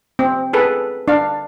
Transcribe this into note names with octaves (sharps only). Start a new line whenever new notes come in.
C4
G#4 A4 B4
D4 F5